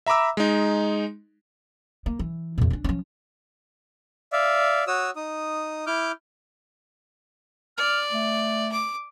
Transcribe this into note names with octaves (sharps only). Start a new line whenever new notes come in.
E5 A#5 B5 D6 E6
G#3 D#4
A#3
E3
E2 A#2
C#4 D4
F3 C#4
D5 E5 F5
F#4 C#5 D#6 E6
D#4 D#6
E4 D6 F6 G6
D5 F6
A3
D6